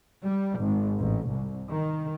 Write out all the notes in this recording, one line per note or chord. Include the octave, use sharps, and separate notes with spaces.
G3
G#1
A1
C2
D#3